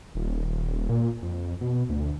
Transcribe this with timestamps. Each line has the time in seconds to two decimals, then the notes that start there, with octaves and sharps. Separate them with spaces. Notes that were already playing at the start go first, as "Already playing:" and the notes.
0.15 D#1
0.89 A#2
1.23 F2
1.61 B2
1.90 D2